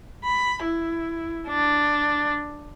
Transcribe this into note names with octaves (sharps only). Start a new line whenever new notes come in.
B5
E4
D4